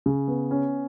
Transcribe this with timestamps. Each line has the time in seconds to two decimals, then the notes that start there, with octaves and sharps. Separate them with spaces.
0.06 C#3
0.28 B3
0.51 C#4